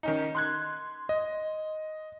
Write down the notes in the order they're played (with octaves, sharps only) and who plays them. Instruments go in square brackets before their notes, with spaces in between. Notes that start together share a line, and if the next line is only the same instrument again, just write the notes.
[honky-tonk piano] D#3 C#4 D#4
C6 F#6 G#6
[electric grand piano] D#5